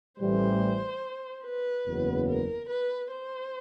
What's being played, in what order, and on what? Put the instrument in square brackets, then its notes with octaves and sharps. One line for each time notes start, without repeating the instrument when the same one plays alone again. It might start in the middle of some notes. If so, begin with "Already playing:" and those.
[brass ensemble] A1 A2 E3 G3 [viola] C5
[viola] B4
[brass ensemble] F#1 E2 C#3 F#3 B3
[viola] A#4
B4
C5